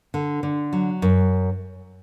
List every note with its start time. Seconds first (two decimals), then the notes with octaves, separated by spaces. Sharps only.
0.14 D3
0.43 D3
0.73 F#3
1.02 F#2